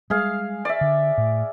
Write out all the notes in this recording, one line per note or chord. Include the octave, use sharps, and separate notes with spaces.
G3 G#3 G#4 F5
D5 E5
D3
A2